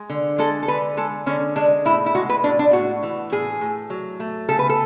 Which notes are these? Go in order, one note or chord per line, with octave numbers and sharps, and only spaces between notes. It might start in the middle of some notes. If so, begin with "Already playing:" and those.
Already playing: G#3
D3
G#3 A4
A4
D3 B4
G#3 A4
D3 C#4
G#3 D4
A2 E4
E4
G#3 F#4
B4
A2 D4
D4
A2 F#4
E3
A2 G#4
A2
F#3
A3
C#3 A4
B4
A4